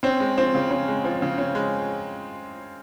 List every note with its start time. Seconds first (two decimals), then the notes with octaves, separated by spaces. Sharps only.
0.03 C4 C#4
0.20 G#3
0.38 F3 C4
0.55 C#3
0.71 C#4
0.88 G#3
1.04 F3
1.22 C#3
1.38 C#4
1.55 G#3